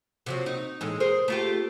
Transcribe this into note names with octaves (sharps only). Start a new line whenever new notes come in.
C3 F3 F#3
D#4
A2 E3 G#3
G#4 A#4 C5
A3 F4 G4